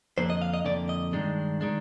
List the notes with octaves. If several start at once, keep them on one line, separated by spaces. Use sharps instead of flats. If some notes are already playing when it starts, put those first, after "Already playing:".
F2 D3 F3 A#3 C5
D#5
F5
D#5
F2 D3 F3 A#3 D5
D#5
G2 D#3 G#3 D4
D#3 G#3 D4